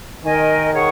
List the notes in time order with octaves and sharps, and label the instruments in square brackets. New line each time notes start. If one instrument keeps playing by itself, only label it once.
[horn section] D#3 [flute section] A#4 D#5 G#5
[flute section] G#4 C#5 F#5 C#6